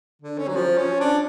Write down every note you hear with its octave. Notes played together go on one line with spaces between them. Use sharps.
D3
C#4
F#3
F3
C#4
D4